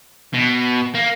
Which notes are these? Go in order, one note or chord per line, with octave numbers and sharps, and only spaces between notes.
B2
A#3